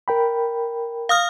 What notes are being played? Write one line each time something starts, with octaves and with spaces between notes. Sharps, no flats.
A#4 G5 B5
F5 D#6 F6